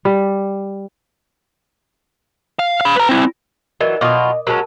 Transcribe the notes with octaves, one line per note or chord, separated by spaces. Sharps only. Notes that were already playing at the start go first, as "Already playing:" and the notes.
G3
F5
F5 B5
B4 A#5
C4 E4
E3 F#3 A#4 D5 D#5
B2 F#3 F4 D#5 D6 D#6
F#3 G#3 C#4 A#4 A5